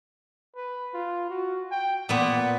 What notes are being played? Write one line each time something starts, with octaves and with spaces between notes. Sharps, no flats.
B4
F4
F#4
G5
A#2 B3 F#5